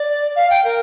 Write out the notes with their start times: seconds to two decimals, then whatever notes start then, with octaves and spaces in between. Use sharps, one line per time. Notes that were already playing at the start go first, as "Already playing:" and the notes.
Already playing: D5
0.36 F5
0.50 G5
0.64 A#4